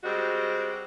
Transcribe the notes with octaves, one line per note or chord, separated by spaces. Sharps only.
G3 G#3 C4 F#4